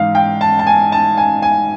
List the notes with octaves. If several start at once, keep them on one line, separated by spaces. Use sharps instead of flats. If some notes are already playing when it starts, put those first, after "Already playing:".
Already playing: G#2 E3 F5
G5
A5
A5
G#5
A5
G#5
G#5